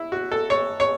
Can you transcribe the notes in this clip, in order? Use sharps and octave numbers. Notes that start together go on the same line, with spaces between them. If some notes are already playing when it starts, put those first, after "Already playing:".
Already playing: E4
F#4
A4
C#5
C#5